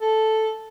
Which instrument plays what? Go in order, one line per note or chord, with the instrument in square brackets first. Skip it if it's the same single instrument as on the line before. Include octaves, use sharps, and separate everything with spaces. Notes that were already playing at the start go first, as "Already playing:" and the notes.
[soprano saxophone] A4